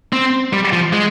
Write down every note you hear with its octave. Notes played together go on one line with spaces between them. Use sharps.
C4
G3
F3
G#3